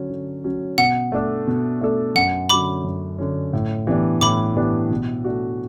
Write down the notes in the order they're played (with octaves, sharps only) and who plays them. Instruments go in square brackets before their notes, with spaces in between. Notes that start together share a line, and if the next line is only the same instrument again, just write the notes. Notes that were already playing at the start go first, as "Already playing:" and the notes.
Already playing: [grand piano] D3 F#3 C#4
D3
F#3 C#4
[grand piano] B2 [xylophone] F#5
[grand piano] A3 D4 A4
B2
A3 D4 A4
[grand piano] F#2 [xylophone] F#5
[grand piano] D3 F#3 C#4 [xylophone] B5 D6
[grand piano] F#2
D3 F#3 C#4
A2
E3 B3 D4 G4
[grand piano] A2 [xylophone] B5 D6
[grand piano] E3 B3 D4 G4
B2
A3 D4 F#4